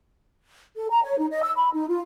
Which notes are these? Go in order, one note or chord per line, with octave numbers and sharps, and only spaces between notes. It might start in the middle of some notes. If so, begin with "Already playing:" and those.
A4
A#5
C#5
D#4
D#5
E6
B5
D#4
F4